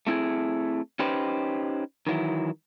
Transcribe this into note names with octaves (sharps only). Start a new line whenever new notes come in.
A3 C4 E4 F#4 G#4
C#4 D#4 G4 B4 C5
D#3 E3 F#3 E4